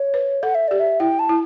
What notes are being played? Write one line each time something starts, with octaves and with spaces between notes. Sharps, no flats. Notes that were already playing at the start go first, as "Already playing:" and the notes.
Already playing: C#5
B4
A4 F#5
E5
G4 D5
E5
E4 G5
A5
E4